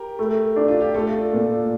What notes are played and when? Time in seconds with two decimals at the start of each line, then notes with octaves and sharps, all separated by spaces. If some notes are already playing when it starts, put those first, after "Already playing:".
Already playing: G4 A#4
0.19 A3
0.56 D4
0.68 F4
0.81 G4
0.94 A3 F4 A4
1.33 A#2